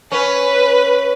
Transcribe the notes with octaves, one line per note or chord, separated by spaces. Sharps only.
C#4 B4